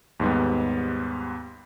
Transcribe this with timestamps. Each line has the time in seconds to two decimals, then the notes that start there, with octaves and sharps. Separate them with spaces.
0.20 D#2 G#2 G3 B3